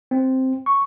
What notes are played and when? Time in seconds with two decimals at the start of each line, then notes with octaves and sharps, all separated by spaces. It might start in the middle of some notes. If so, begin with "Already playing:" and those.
0.11 C4
0.66 C#6